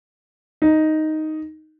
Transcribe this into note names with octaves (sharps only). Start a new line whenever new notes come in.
D#4